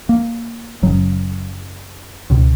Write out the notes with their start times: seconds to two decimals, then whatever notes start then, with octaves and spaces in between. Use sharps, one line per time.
0.09 A#3
0.82 F#1 F#2 C#3 F#3
2.30 C#2 B2